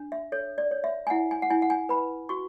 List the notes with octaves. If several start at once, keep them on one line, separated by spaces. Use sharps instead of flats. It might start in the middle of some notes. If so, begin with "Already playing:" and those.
Already playing: D4
E5
A4 C#5
D5
C#5
E5
G#5
E4 F#5
G#5
F#5
E4 G#5
F#5
G#5
B4 B5
F#4 C#6